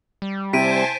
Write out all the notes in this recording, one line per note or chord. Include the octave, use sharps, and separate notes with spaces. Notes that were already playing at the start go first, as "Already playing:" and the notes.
G3
C3 E4 C5 G#5 A5 B6 D7 D#7